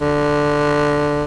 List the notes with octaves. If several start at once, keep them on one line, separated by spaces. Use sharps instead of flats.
D3